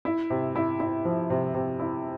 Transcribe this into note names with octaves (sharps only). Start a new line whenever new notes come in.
E4
C3
E4
E4
F3
C3
C3
E4